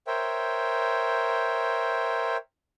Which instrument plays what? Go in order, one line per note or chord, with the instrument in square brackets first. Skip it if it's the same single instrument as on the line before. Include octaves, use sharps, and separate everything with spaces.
[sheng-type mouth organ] A#4 C5 C#5 E5 G5